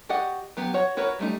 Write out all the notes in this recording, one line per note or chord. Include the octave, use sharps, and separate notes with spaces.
F#4 G4 D5 D#5 F#5
F#3 B3 G4
F#4 C#5 F#5
E4 F#4 A#4 B4 C#5
G3 A3 D#4